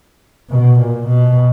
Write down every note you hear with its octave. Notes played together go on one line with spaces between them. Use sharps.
B2
A#2
B2